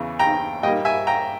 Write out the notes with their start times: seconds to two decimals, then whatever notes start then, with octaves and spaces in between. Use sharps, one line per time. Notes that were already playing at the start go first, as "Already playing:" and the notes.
Already playing: E2 C#3 E3
0.19 G5 A#5
0.63 A#2 G3 A#3 D#5 G5
0.85 E5 G#5
1.07 G5 A#5